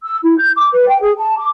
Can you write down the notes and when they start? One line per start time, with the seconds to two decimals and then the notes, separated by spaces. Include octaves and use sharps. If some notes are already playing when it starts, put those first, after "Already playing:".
0.03 E6
0.23 E4
0.38 G6
0.56 D6
0.72 B4
0.87 G5
1.01 G#4
1.17 A5
1.38 D6